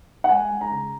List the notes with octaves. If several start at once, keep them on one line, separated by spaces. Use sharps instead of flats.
F#5
G#3 G#5
G#3
A#5
C#3